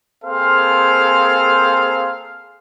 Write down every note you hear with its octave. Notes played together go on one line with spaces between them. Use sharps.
A#3 C4 G#4 A4 C5 F5